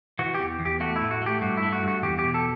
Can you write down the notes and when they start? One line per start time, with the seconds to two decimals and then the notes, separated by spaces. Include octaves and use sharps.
0.19 E3 F#4
0.34 E2 G4
0.60 E2
0.65 G4
0.80 A3 F#4
0.96 E4
1.01 A2
1.11 F#4
1.22 A3 G4
1.41 G2 F#4
1.57 E4
1.62 A3
1.73 F#4
1.83 G2 F#4
2.03 E2 G4
2.19 G4
2.24 B2
2.34 A4